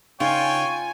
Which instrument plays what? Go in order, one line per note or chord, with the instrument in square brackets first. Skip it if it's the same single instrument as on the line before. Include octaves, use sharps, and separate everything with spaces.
[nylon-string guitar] C#3 D4 D#4 [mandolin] F4 [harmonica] C#5 G5 [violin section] G#5